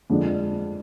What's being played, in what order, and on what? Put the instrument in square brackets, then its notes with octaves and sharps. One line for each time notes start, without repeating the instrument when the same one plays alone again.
[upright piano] F2 D3 F3 G#3 D4